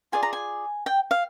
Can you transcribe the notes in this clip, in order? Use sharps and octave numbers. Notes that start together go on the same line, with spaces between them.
F4 G#4 D5 G#5
A#5
G#5
G5
F5